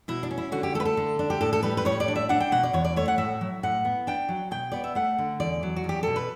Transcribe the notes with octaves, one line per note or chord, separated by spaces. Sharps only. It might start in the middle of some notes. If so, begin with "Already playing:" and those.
B2 E4
D4
C#4
E4
D3 F#4
G4
A3 A4
B4
A4
D3
D4
G4
A2 A4
A4
G3 B4
B4
A2 C#5
D5
D4
E5
D4 F#5
G5
B2 F#5
D5
E2 C#5
D5
A3 C#5
F#5
A2 E5
F#3
A2 F#5
B3
D4 G5
F#3
B2 G5
B3 D5
E5
A3 F#5
D3
E2 D5
F#3
F#4
E2
G4
B2 A4
B4